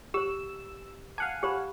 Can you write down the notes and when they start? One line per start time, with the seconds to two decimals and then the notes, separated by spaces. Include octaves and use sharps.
0.14 G4 C5 E6
1.18 F5 F#5 G#5 A5
1.43 G4 C5 B5